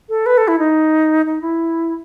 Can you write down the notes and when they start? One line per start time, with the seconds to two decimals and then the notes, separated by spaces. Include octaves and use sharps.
0.09 A4
0.26 B4
0.37 A4
0.48 E4
0.59 D#4
1.26 D#4
1.41 E4